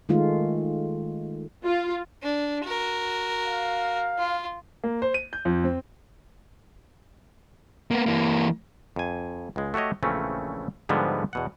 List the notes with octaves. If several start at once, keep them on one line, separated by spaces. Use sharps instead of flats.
D#3 G#3 A3 F4
F4
D4
F#4 A#4
F5
F4
A#3
C5
D#7
G6
F2
C4
A#3 B3
E3 A#3
F2 G#5
C#2 G#3
A3 F#4 G4 C#5 D#5
A#1 C#3 E3 A3 C4 C#4
G#2 D3 F3 G3 G#3 B3
E2 B2 F#5